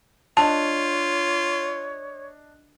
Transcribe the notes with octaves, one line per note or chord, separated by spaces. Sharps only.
D4 F4 C#5 D#5 A5